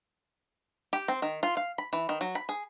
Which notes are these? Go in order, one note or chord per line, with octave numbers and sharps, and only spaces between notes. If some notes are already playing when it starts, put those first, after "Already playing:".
G4
C4
D#3
F4
F5
B5
E3
D#3
F#3
B5
G#4